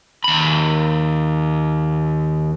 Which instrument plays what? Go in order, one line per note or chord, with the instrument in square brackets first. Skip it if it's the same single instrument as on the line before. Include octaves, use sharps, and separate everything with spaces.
[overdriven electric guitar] D#2 B5